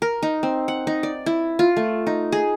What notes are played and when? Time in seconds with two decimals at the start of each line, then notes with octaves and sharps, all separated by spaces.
0.02 A#4
0.23 D#4
0.43 C4
0.68 F#5
0.87 D#4
1.03 D5
1.26 E4
1.59 F4
1.77 A3
2.07 D#4
2.32 G#4